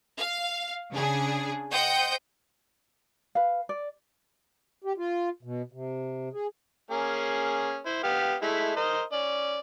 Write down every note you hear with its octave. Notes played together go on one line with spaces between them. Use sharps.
F5
C#3 D4 G#4
C5 D#5 F#5 G5 D#6 G6
B4 F5
D5
G4
F4
B2
C3
G#4
A#3 C#4 G#4
E4 C5
B3 G4 F5
G#3 A3 E4
A#4 C5 D#5
C#4 D5